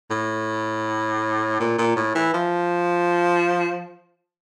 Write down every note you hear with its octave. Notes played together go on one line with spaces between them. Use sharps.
A2
A#2
A#2
A2
E3
F3